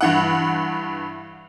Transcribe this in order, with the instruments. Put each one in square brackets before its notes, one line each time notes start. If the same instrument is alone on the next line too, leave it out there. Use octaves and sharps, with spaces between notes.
[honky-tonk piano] G2 E3 F#5